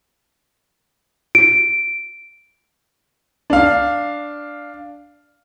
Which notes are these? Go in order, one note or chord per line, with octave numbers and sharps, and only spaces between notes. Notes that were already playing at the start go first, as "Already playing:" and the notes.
D7
D4 F5